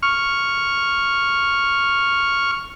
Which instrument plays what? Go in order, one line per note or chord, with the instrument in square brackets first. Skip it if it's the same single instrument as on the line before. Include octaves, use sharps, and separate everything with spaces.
[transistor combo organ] C#6 F6